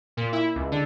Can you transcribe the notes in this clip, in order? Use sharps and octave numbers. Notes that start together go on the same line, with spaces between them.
A#2
E4
C#2
D3